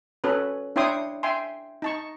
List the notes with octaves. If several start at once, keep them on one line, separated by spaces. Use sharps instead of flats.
C#4 F#4 A4 B4
D4 E4 C#5 G5 C6 D#6
E5 G5 G#5 C6
D#4 A5 C#6